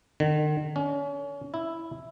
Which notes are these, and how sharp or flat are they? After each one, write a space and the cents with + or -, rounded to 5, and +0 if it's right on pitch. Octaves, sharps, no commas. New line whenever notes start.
D#3 -45
C#4 +35
E4 +0